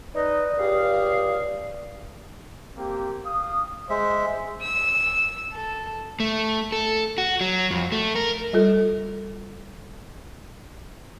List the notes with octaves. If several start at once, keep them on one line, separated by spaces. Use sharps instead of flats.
D#4 B4 D5 D#5 D#6
C#2 G4 G#4 F5
A#3 C4 G4
F5 D#6
G#3 C5 E5
E6
A4
A3
A4
F#4
F#3
F2
A3
A#4
G3 F4 A4